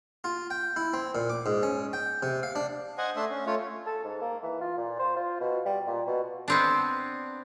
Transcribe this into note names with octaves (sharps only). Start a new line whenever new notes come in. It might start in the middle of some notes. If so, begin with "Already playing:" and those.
F4
G5
E4
C4
A#2
D6
G#2
C#4
G5
C3
F5
D4
C5 D#5 F#5 G#5
A3 D4 E5 C6
C#4
A3 F4 C#5
A4
G#2
A#3
E3
F4
A#2
C5
F4
B2
G3
A#2
B2
B3 C4 D4